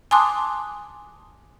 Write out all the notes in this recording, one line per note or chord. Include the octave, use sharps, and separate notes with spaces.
G#5 A5 C6 D6 D#6 F#6